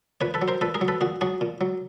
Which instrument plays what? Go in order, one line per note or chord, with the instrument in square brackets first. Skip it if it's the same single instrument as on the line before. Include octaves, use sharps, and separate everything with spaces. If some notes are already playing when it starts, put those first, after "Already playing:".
[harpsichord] A#2 B4 C#5
A4 B4
F#3
A#4 C5
A#2 A4 B4
G#4 A#4
F#3
A4 B4
A#2 F#4 G#4
F#3 F#4 G#4
A#2
F#3